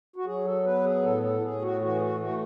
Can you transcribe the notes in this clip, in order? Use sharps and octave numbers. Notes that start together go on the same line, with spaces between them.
F#4
F#3 G#4
A4
B3 B4
G#4
A2 A4
A4
A2 G#4
F#4
E3 F#4
G#4
F#4
A3 F#4